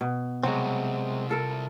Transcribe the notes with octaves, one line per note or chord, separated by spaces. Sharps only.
B2
C2 F#3 G#3 C4 F#4
F4 A4 A#4